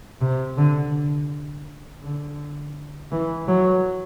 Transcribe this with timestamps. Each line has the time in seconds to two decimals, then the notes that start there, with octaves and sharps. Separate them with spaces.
0.21 C3
0.57 D3
2.02 D3
3.11 E3
3.48 F#3